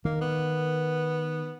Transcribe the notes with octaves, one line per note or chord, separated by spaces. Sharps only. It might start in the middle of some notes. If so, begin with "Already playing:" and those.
D#3 A#3
B3